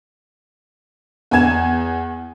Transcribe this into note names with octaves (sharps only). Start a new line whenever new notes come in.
E2 B3 G#5 G#6 E7